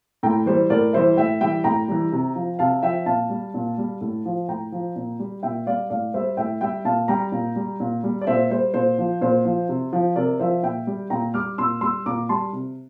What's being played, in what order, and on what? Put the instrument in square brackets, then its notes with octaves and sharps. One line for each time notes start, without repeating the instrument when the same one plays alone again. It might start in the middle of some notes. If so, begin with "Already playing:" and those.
[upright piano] A2 G5 A#5
E3 G3 C5
A2 A#4 D5
E3 G3 C5 E5
A2 E5 G5
E3 G3 E5 G5
A2 G5 A#5
E3 G3
C3
F3
C3 F5 A5
F3 E5 G5
A#2 F5 A5
G3
A#2
G3
A2
F3
A2 G5 A#5
F3
A#2
G3
A#2 E5 G5
G3 D5 F5
A2 D5 F5
G3 C5 E5
A2 E5 G5
G3 E5 G5
A#2 F5 A5
G3 G5 A#5
A#2
G3
A#2
G3
D5
A#2 C5 E5
G3 C5
A#2 C5
F3
A#2 C5
F3
C3
F3
C3 A#4 D5
F3 C5 E5
A#2 E5 G5
G3
A#2 G5 A#5
G3 D6 F6
A#2 C6 E6
G3 C6 E6
A#2 A#5 D6
G3 A5 C6
C3